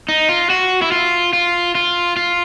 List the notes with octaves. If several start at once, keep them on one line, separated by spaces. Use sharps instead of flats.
D#4
F4
F#4
E4
F4
F4
F4
F4